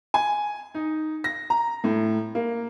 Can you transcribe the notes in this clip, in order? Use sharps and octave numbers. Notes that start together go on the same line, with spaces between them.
G#5
D#4
A#6
A#5
A2
A#3